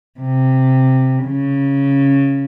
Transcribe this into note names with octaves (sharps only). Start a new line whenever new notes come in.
C3
C#3